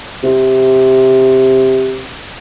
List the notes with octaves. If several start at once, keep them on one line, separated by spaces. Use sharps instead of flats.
C3